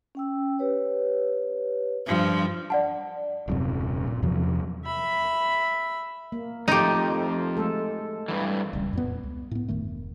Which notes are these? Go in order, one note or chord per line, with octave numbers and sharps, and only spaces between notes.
C#4 G5 E6
G4 B4 C#5
G2 F3
D5 F#5 A5
D#1 F#2 C3
A#2
E2 C3 F3 F#3
E5 B5
A#3
F2 F3 A3 D#4 G4
G#3 A3 A4
G2 E3
D1 C#2 G3
F2 A#2 B3
C#2
A2 B3
E1 G2 D#3 A3